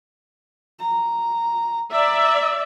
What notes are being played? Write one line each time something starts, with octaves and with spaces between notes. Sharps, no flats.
A#5
D5 E5 A#5